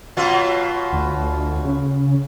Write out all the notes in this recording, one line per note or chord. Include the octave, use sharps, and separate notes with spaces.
B2 F#3 F4
D2
C#3